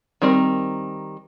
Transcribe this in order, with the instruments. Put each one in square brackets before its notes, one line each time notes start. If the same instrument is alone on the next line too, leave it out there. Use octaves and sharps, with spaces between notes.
[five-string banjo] D#3 G3 C4 A#4